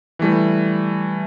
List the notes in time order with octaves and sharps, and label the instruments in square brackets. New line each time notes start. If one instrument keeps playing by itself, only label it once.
[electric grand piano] E3 G3 A3